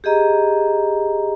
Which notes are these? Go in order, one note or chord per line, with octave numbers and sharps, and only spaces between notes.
G4 G#4 D#5 A#5